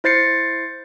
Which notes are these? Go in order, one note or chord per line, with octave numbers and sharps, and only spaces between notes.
E4 C5 A6 C7 C#7